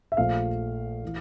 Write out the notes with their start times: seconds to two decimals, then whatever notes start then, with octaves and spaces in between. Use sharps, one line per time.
0.12 E5
0.17 A#1 A#2 F3 A3 F5
1.05 E3